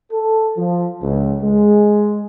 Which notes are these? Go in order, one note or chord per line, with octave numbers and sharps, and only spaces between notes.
A4
F3
C#2
G#3